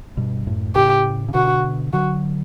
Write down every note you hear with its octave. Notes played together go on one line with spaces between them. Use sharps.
G2 B2
F#2 A2
A2 C#3 G4
C#3
B2 D3 F#4
D3 F#3 F#4